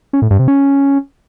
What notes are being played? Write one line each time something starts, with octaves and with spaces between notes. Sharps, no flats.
C#4
A2
G2
C3
C#4